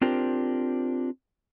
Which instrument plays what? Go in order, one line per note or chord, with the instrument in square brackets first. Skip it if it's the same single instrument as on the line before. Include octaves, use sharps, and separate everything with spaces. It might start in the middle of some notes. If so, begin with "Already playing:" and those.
[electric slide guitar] C4 D4 F4 G4 A#4 C5